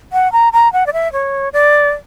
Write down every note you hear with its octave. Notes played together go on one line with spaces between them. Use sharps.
F#5
A#5
A#5
F#5
D5
E5
C#5
D5